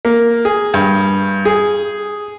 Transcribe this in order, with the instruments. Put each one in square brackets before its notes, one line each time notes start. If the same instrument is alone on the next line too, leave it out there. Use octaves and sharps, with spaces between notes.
[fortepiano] A#3
G#4
G2
G#4